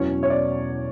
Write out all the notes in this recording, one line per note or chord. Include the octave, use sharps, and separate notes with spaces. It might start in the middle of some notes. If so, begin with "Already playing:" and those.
Already playing: E1 E2 B2 F#3 C#4 C#5
C#5
D5